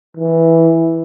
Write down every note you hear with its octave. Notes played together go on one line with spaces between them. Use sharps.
E3